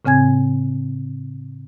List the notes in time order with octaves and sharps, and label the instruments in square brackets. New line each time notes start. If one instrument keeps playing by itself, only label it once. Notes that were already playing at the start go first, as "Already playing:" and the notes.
[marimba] A2 C#3 C4 G#5 G#6